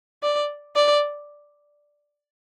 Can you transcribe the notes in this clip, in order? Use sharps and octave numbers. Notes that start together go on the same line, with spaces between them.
D5
D5